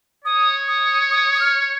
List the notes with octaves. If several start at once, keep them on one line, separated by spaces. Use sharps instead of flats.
C#5 D#6
D#6
D#6
D#6
F6